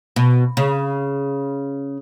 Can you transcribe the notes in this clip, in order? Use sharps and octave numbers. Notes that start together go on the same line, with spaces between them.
B2
C#3